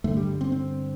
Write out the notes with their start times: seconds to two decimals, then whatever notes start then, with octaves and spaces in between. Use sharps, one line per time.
0.04 G2 D3 A3
0.17 G3
0.41 C4
0.52 C4